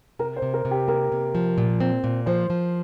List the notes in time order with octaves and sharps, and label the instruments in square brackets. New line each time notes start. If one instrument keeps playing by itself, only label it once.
[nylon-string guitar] C3 [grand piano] A#4
[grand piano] C5
[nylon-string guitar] C3
[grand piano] A#4
[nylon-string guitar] C3
[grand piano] G4
[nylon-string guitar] A#3 [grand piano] A#4
[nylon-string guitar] C3
F3
A#2
C4
A#2
[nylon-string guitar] F3 [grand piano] C5
[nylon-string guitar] F3